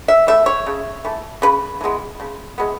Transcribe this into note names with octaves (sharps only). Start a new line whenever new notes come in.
E5
E3 A3 E5
C#5
C#3
E3 A3
C#3 B4
E3 G#3 B3
C#3
E3 G#3 B3